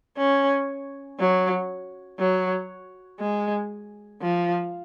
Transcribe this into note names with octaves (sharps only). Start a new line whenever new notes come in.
C#4
F#3
F#3
G#3
F3